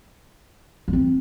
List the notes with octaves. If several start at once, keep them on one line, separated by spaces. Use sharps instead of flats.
A#3
C4